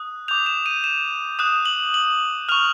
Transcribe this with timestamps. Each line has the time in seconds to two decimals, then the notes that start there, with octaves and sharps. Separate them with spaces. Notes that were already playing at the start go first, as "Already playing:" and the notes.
Already playing: D#6 F#6
0.28 D6 G6 F7
0.46 E7
0.66 D#7
0.84 E7
1.39 D#6 F#6 E7
1.65 F#7
1.94 F#7
2.49 C#6 F6 F7